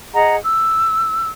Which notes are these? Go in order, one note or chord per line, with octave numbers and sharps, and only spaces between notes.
G#4 D#5 F#5 A#5
E6